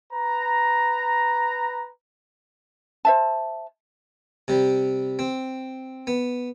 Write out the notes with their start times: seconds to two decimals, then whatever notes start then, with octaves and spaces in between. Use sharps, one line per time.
0.13 B4 A#5
3.05 C5 E5 A5
4.48 C3 G3
5.19 C4
6.07 B3